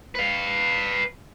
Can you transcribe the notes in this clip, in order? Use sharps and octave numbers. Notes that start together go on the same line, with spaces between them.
B4 F5